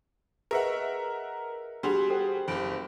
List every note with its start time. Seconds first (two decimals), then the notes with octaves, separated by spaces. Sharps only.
0.51 G#4 A#4 B4 D#5 E5 F#5
1.83 G3 D4 F#4 G#4 C6 F7
2.10 A4 C5 G5
2.48 F#1 G4 B5 D7